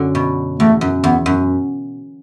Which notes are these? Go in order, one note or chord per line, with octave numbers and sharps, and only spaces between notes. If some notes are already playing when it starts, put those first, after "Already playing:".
Already playing: F#2 D3 F#3
B2
E2 A3
F#2
E2 B3
F#2